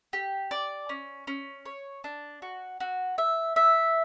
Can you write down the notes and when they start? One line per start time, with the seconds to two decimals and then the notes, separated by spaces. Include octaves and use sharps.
0.13 G4
0.51 D5
0.89 C#4
1.27 C#4
1.66 C#5
2.04 D4
2.42 F#4
2.80 F#4
3.18 E5
3.56 E5